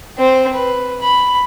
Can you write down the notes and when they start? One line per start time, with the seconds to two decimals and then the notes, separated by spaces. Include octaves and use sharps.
0.18 C4 C5
0.53 B4
1.01 B5